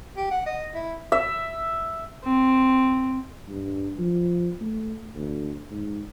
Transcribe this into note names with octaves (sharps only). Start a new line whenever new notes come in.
G4
F#5
D#5
E4
E5
C4
G2
F3
A3
D2
G#2